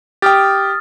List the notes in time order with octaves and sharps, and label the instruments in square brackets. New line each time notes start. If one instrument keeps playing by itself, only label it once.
[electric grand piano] G4 G5 [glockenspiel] D#6 F6 A6